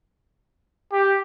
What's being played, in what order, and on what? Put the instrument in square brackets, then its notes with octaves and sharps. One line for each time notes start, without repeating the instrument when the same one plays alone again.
[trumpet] G4